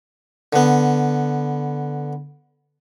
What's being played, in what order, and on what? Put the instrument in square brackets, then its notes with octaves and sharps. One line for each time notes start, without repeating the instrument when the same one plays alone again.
[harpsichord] D3 B3